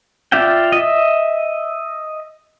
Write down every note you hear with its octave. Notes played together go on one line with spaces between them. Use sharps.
F4 D5 E5 F5 G5
D#5 E5